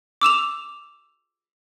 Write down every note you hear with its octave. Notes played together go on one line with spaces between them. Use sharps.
D6 E6 E7 F7